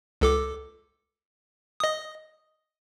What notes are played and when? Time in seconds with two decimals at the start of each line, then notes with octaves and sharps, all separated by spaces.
0.21 C#2 A4 D6
1.80 D#5 D#6